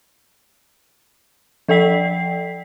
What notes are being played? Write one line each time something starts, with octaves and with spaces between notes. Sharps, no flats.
F3 A4 D5 G5 B6 C7